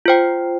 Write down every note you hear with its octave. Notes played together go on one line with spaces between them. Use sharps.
F4 C5 G5